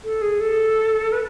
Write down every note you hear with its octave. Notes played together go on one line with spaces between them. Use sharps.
A4
G#4
A4
B4